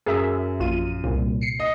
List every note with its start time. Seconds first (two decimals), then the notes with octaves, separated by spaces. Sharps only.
0.06 F#2 G#4 A#4 E5
0.60 A#1 F4 D#7
1.04 C2 A#2
1.42 C7 C#7
1.60 D#5